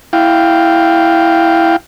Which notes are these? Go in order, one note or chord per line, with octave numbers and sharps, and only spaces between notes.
E4 F5 G5